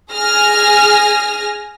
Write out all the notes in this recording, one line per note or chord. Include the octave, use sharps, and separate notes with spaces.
G#4 G#5 F6 A#6